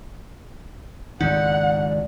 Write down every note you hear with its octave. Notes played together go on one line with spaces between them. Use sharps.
C#2 G#2 D#3 D#4 D5 F#5